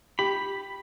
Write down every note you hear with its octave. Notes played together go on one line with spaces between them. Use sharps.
G4 B5